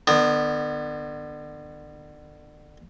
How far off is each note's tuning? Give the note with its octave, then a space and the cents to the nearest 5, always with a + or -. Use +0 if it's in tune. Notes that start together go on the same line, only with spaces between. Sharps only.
D3 +35 B3 +0